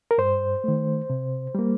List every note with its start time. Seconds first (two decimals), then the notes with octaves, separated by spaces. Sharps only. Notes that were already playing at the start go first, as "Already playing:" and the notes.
0.11 A#4
0.18 G2 C5
0.64 D#3 A3
1.10 C3
1.55 G3 A#3